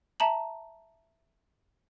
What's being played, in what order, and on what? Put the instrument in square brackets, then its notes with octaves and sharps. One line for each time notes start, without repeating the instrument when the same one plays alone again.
[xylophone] E5 A5 A#5 F#7